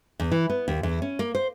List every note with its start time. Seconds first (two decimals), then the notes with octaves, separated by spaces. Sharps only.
0.20 E2
0.31 E3
0.49 B3
0.68 D#2
0.83 E2
1.02 C#4
1.19 A#3
1.35 C5